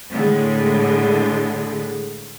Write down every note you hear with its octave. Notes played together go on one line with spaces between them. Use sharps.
A2 D3 G#3